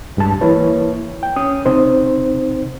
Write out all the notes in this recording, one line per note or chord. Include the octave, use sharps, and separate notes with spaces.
C2 G2 G#3 A5
E3 A#3 E4 B4 C#5
G5
C#4 D#6
C3 C4 D#4 C5